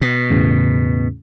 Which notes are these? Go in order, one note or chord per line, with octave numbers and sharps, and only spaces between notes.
B2
E2 A2 C#3